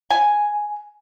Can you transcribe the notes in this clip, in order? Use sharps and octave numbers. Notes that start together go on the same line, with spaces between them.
G#5